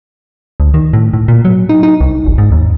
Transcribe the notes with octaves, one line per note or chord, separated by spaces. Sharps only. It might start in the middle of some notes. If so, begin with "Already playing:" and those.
D2
D#3
A2
A2
A#2
F#3
D#4
D#4
C2
G1
G#2
D#2